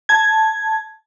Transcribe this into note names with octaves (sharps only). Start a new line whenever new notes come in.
A5 G#6